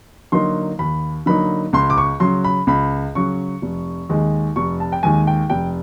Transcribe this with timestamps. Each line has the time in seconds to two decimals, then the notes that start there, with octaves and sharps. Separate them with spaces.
0.32 D3 F#3 A#3 D#4 C6
0.79 D#2 B5
1.26 D3 F#3 A#3 D#4 B5
1.73 C#2 C6
1.90 D6
1.98 C#6
2.20 C#3 F#3 C6
2.44 B5
2.67 C#2 B5
3.15 C#3 F#3 C#6
3.62 F1
4.09 D#2 D#3 G#3
4.56 F1 C#6
4.80 A5
4.92 G5
5.03 D#2 D#3 G#3 G#5
5.27 G5
5.50 F1 G5